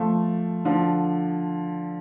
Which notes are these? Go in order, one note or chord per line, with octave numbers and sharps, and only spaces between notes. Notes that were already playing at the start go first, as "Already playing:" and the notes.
Already playing: F3 A3
D3 F3